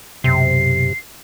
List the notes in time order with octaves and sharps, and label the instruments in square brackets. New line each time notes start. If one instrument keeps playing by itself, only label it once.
[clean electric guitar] B1 F#2 [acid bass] C3 [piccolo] C7